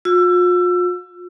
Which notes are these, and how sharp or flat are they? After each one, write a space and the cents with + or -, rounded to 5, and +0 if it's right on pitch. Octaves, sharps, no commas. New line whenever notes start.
F4 +40 E6 +25